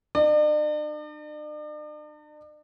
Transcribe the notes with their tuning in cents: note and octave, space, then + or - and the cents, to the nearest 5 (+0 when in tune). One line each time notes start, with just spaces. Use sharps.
D4 +45 D5 +45